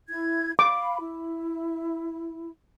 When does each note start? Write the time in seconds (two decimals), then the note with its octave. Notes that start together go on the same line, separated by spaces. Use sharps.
0.08 E4 G#6
0.59 F5 B5 D6
1.00 E4